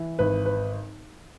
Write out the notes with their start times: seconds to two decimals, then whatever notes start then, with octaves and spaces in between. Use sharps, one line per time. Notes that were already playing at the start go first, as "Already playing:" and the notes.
Already playing: E3
0.19 G#1 B4
0.46 B4